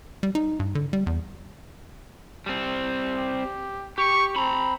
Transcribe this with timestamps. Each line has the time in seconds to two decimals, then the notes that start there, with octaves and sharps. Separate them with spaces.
0.23 G3
0.35 D#4
0.60 G2
0.75 D3
0.93 G3
1.07 E2
2.46 G3 C4
3.16 G4
3.98 G4 C#6
4.36 C4 A#5 B5